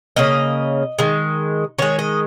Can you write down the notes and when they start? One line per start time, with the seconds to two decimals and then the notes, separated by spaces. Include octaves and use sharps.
0.16 C#3 A#3 D#5
0.99 D#3 G#3
1.78 D#3 G#3 C#5
1.99 D#5